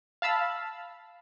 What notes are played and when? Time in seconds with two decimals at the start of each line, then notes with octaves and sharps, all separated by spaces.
0.22 F5 A5 B5 E6